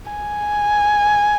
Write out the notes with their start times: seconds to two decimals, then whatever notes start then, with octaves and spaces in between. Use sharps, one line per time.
0.11 G#5